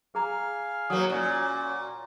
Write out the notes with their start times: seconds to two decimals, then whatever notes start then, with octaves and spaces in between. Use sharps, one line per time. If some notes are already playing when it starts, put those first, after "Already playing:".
0.15 G#4 F5 G#5 A#5 F6
0.90 F#3 A#3 C#5 F#5 D#6
1.10 A#2 C#4 F#4